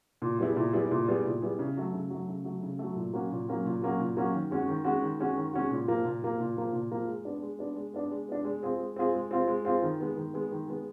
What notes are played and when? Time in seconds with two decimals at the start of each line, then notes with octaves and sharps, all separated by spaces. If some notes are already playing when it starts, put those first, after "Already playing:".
0.22 A#2
0.39 G3 B3 E4 G#4
0.56 A#2
0.73 G3 B3 E4 G#4
0.91 A#2
1.08 G3 B3 E4 G#4
1.25 A#2
1.42 G3 B3 E4 G#4
1.59 C#3
1.77 F#3 A3
1.94 C#3
2.10 F#3 A3
2.28 C#3
2.44 F#3 A3
2.63 C#3
2.79 F#3 A3
2.96 A#2
3.13 F#3 A#3 C#4 F#4
3.31 A#2
3.48 F#3 A#3 C#4 F#4
3.66 A#2
3.82 F#3 A#3 C#4 F#4
4.00 A#2
4.16 F#3 A#3 C#4 F#4
4.33 D#3
4.51 G#3 C#4 F#4
4.68 D#3
4.84 G#3 C#4 F#4
5.02 D#3
5.19 G#3 C#4 F#4
5.36 D#3
5.53 G#3 C#4 F#4
5.71 A#2
5.87 F3 A#3
6.05 A#2
6.22 F3 A#3
6.40 A#2
6.57 F3 A#3
6.73 A#2
6.91 F3 A#3
7.07 G#3
7.25 B3 D4
7.42 G#3
7.59 B3 D4
7.76 G#3
7.94 B3 D4
8.11 G#3
8.29 B3 D4
8.45 G#3
8.63 C4 F4 G#4
8.79 G#3
8.96 C4 F4 G#4
9.14 G#3
9.31 C4 F4 G#4
9.47 G#3
9.65 C4 F4 G#4
9.82 D#3
10.00 G#3 B3
10.16 D#3
10.34 G#3 B3
10.51 D#3
10.67 G#3 B3